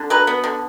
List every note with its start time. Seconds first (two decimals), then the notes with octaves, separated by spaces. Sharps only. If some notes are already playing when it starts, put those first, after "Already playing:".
Already playing: D3
0.10 F#3 B4
0.27 B3
0.44 D3